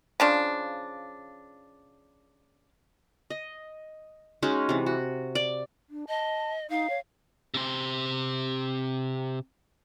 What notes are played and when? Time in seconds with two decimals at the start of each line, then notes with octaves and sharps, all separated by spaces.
0.20 C#3 F3 D4
3.30 D#5
4.42 G#3 C#4 D#4 F#4
4.69 C3 E3
4.86 F#4
5.35 D5
5.90 D4
6.08 D#5 A5
6.70 D#4 F5
6.90 C#5
7.54 C3 C5